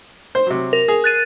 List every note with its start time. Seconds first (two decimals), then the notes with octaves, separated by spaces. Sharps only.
0.35 C5
0.47 C3 F#3
0.73 A#4
0.88 G#4
1.04 F#6 A6 D#7